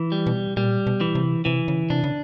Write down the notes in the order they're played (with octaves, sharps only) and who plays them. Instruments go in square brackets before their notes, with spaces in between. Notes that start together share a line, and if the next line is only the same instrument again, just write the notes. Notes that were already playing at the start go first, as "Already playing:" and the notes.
Already playing: [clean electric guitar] E3
G3
[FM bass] B2
[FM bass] A#2 [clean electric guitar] G3
[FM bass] B2
[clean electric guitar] E3
[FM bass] C3
[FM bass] C3 [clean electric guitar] E3
[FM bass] C#3
[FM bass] C3 [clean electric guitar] D4
[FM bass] C#3